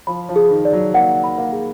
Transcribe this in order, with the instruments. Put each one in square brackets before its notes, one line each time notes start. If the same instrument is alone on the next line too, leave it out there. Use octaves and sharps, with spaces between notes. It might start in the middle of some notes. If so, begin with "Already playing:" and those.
[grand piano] F3 [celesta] B5
[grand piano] F3
[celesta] G#4
[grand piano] D#3
[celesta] D5
[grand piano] F#3
[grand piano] A#3 [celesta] F#5
[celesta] B5
[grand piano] A#3
[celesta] G#4